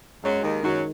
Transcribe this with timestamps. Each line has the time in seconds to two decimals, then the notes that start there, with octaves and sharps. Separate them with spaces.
0.23 F#2 F#3 G#3
0.43 D#2 D#3
0.63 F#2 D#3 F#3